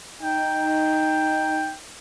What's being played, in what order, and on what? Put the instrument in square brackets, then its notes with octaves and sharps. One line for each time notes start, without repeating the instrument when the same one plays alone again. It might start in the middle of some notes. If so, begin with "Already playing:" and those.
[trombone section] D#4 [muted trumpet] G5